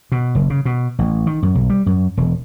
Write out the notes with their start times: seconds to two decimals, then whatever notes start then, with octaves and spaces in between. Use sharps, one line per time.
0.12 B2
0.35 F#1
0.50 C#3
0.65 B2
0.99 A1
1.27 D#3
1.42 F#2
1.55 B1
1.70 G3
1.86 F#2
2.17 E1